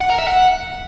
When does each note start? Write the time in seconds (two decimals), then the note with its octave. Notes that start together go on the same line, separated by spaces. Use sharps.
0.01 F#5
0.10 A#4
0.18 E5
0.27 F#5